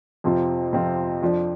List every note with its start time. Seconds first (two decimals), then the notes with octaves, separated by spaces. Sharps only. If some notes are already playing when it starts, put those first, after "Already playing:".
0.24 F2 C3 F3 C4 F4
0.73 F2 C3 F3 C4 F4
1.22 F2 F3 D4